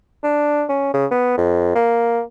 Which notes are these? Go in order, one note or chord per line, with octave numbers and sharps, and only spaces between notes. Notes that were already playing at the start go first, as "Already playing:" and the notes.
D4
C#4
C#3
B3
F2
A#3